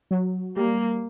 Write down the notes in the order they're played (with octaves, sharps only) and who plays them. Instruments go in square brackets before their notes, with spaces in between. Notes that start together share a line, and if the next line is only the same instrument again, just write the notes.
[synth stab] F#3
[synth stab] G3 [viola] A#3